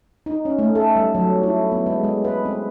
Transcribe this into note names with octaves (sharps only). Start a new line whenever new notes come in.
D#4
C#4
A3
A4
G3
F#3
E4
B3
G#3
G#3
B4
C4